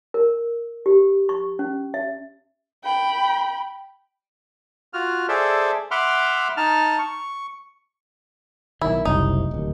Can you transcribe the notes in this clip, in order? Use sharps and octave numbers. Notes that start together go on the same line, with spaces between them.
A#4
G4
C#6
C#4
E5
G5 B5
F4 F#4 F6
G#4 A4 C5 D5 E5
E5 F#5 B5 C6 D6 F6
D#4 A5 F6
C#6
B1 D#3 E4
F#1 C2 C3 D#4
D1 D#2